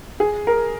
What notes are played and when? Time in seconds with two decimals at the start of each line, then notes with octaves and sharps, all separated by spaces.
0.20 G#4
0.47 A#4